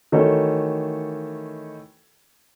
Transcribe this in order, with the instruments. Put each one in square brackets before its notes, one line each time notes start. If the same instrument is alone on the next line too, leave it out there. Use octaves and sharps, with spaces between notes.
[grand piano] D#3 E3 A3 F#4 A4 C#5